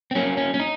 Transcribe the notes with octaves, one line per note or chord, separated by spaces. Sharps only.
C4
F#3 A#3 C#4
C#4
C#4
D#4